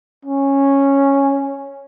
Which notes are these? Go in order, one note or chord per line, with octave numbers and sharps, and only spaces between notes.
C#4